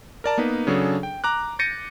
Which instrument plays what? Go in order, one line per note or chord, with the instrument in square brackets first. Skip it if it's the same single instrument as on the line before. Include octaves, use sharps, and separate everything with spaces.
[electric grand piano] A#4 D5 A5 A#5
A#3 B3 D#4 B4
C#3 F#3 D4 G#4 A4 C#5
G5
A#5 D6 F#6
G6 A6 A#6 C#7 D#7